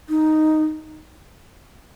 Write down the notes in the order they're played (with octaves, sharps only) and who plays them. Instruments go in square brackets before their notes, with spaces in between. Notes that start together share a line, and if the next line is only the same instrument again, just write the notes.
[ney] D#4